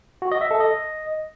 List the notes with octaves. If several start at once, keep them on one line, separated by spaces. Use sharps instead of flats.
F#4
D#5
E5
A4
D#5